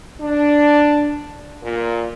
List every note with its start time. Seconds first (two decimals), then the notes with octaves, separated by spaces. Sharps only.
0.20 D4
1.62 A#2